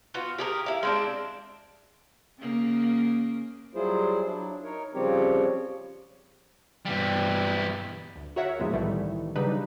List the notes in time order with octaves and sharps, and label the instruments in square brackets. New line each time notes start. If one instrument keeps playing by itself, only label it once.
[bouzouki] B3 F4 F#4
G4 G#4 A#4
E4 F5
G#3 C4 D4
[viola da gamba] C#3 A#3
[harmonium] F#3 G3 E4 F4 G#4 C5
F#3 D4 E4
D#4 A#4 C#5
C#3 F3 G3 C4 G4 C#5
[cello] G2 B2 [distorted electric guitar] E3 G3
[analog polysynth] D2
F#4 A#4 C#5 E5 F#5
D#2 G#2 E3 F3 G#3 B3
C2 A2 D#3 E3 G3 A3
C#3 F#3 G3 D4 D#4 B4